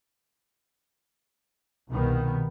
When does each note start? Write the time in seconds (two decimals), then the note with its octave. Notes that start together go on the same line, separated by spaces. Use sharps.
1.90 C2 B2 D#3 B3